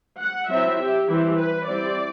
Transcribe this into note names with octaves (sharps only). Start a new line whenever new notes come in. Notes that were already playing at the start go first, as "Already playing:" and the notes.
F#5
F#3 C4 E4 E5
G4
E3 G3 C4 E4 G4
B4
G3 C4 E4 D5